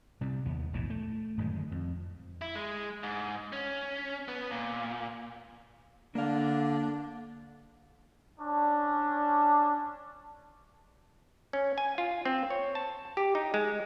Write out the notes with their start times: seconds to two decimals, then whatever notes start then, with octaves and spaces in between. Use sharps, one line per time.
0.21 C3 G3
0.46 D#2 B3
0.73 E1 A#1 G#2 E3
0.90 A3
1.37 D1 F#2 D#3 G#3
1.72 F2
2.42 E4
2.55 G#3
3.03 G#2
3.53 C#4
4.28 B3
4.51 A#2
6.15 D3 A#3 D4 F5
8.40 C#4 D4
11.53 C#4
11.78 G#5
11.98 F4
12.25 C4
12.50 C#5
12.75 A5
13.17 G4
13.35 D#4
13.54 G#3